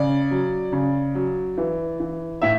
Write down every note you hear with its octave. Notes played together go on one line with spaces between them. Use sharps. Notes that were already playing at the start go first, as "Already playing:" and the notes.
Already playing: C#3 D5
F#3
C#3
F#3
E3
E3
A2 E5